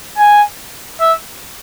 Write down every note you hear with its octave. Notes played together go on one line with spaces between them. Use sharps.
G#5
E5